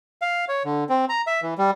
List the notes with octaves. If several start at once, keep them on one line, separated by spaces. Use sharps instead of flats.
F5
C#5
D3
C4
A#5
E5
E3
G3